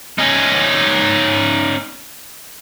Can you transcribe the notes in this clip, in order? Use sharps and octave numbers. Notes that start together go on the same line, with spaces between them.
C#4 D#4